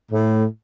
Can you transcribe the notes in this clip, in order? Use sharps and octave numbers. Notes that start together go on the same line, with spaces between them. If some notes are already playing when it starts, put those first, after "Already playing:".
A2